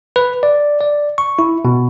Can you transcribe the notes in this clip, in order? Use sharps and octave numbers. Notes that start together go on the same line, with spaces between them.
B4
D5
D5
C#6
E4
B2